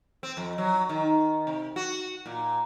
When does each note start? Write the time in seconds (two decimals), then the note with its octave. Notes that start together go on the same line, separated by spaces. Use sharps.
0.23 C4
0.37 F2
0.58 F#3
0.89 D#3
1.47 C3
1.76 F#4
2.26 A#2